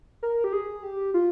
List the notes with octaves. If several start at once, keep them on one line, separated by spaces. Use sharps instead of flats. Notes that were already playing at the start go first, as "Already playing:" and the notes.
A#4
G4
G#4
G4
F4